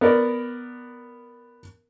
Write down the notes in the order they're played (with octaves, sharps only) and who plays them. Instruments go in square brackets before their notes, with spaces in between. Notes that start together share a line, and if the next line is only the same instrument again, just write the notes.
[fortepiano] B3 A#4 D5